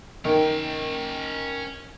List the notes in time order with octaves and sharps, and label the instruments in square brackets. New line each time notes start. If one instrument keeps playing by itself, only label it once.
[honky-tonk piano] D#3 [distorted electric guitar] C#4 G5